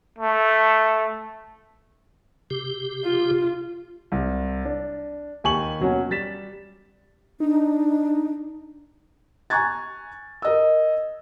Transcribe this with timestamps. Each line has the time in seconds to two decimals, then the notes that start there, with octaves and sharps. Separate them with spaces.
0.19 A3
2.51 C3 G4
3.04 F4
4.12 C2
4.65 D4
5.44 D#2 G4 G#5 C#6 F#7
5.80 B2 F#3 C#4
6.10 G3 A6 B6 E7
7.40 D4 D#4
9.50 G#5 A#5 C#6 F#6 G#6 A6
10.42 A#4 D#5 E6